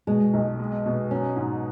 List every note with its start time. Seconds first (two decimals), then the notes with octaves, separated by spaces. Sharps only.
0.07 B2 G#3
0.33 B1
0.59 G#3
0.86 B2
1.11 F#3 C#4
1.37 G#2